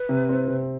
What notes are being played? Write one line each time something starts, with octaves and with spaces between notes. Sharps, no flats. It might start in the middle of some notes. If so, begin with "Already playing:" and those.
Already playing: B4
C3
C4
C3